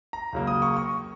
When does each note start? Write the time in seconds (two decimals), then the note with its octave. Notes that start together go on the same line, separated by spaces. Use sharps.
0.13 A#5
0.33 C#2 C#3 F#3 A#3
0.47 D#6
0.62 C#6
0.77 C#6